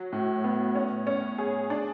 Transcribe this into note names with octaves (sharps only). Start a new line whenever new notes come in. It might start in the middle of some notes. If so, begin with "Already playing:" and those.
Already playing: F#3
A2
B3
C#4
C#4
G#4
D4